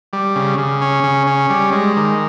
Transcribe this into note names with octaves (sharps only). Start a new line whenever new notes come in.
G3
C#3
C#3
C#4
C#3
C#4
G3
G#3
D#3